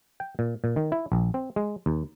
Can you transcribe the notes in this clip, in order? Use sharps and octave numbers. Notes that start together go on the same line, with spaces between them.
G5
A#2
A#2
D#3
E4
A#1
C4
G#3
D#2